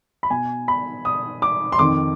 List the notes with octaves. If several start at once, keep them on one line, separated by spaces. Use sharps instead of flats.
B5
B2 G#5
B5
D#6
D6
C6
F2 D#3 D6